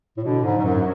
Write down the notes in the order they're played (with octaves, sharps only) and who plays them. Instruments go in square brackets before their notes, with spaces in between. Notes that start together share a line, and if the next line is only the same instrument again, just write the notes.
[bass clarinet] A2
[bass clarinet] B2 [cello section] D3
[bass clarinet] G#2
[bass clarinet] G#2 [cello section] F#3
[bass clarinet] F#2